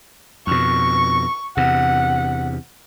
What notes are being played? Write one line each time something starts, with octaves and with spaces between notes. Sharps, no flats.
F2 B2 C#6
E2 C3 F#5